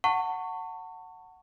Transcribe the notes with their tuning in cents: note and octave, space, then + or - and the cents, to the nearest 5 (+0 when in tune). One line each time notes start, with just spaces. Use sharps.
F#5 +0 A5 +35 C#6 +0